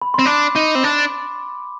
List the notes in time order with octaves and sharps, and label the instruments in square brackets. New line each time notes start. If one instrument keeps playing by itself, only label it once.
[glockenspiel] B5
[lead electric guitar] C4 [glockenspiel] C6
[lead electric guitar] D4 [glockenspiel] D6
[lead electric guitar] D#4
C4
D4